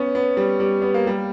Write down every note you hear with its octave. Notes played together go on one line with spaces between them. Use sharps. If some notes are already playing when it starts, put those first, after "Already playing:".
Already playing: B3 C#4
B3
G3
G3
B3
A#3
G3